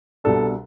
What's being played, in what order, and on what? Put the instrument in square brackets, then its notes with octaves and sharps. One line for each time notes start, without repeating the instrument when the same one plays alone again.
[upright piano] C2 B2 G3 D4 [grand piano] A4